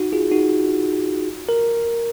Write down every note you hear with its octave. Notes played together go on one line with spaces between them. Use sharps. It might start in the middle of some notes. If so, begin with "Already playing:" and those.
Already playing: D#4 F#4
F4 G#4
D#4 F#4
A#4